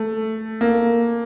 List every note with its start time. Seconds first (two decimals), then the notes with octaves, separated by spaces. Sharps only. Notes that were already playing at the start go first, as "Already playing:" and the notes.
Already playing: A3
0.61 A#3